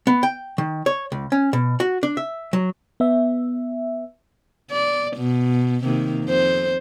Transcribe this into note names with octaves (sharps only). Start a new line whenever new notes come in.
B3
G5
D#3
C#5
C#2
C#4
B2
F#4
D4
E5
F#3
B3 E5
D5
B2
C3 D#3 A#3
F2 C5